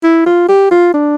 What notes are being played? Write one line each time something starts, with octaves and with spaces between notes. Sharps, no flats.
E4
F4
G4
F4
D4